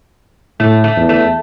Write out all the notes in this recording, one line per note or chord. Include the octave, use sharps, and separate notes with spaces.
A2 A3
A3
E2
A3